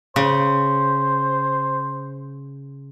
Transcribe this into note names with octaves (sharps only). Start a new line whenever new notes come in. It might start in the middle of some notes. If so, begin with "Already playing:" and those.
C#3 C5